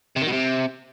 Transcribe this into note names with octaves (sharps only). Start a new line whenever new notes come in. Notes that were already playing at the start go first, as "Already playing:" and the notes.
C3
D#3
B2
C3